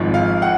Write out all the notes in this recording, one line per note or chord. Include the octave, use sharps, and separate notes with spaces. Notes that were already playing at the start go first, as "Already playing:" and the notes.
Already playing: G#1 G#2 F3
F5
F#5